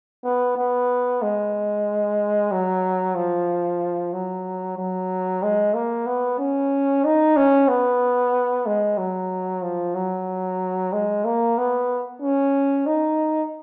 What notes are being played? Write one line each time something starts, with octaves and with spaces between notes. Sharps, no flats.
B3
B3
G#3
F#3
F3
F#3
F#3
G#3
A#3
B3
C#4
D#4
C#4
B3
G#3
F#3
F3
F#3
G#3
A#3
B3
C#4
D#4